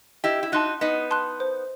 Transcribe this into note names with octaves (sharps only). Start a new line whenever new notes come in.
E4 G4 D#5
E4
D#4 F#4 A5 C6 F#6
B3 D#4 D#5
A5 C6 F#6
C5